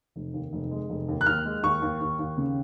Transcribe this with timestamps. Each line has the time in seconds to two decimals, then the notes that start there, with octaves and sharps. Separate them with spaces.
0.16 F1
0.34 D#2
0.53 F1
0.71 G#3
0.90 F1
1.09 D#2
1.21 F#6
1.26 D#2 F6
1.45 G#3
1.63 D#2 C#6
1.82 D#2
2.01 D#2
2.19 D#2
2.37 C#3